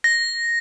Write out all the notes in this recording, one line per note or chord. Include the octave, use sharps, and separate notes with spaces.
A#6